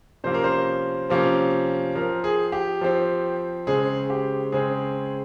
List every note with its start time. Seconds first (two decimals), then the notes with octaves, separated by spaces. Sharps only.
0.24 C3 F3 A#3 C#4 C5
0.34 A#4
0.44 C5
1.10 C3 F3 A#3 C#4
1.95 F3 C4 A#4
2.24 G#4
2.52 G4
2.81 F3 C4
3.67 C#3 G#3 C4 G#4
4.10 G4
4.52 C#3 G#3 C4 G#4